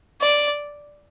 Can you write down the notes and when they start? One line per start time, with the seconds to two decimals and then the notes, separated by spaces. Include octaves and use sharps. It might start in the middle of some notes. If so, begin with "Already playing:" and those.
0.21 D5